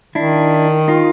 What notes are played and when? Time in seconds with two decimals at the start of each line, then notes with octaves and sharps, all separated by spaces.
0.15 D#3 D4 E4
0.88 D#4 F4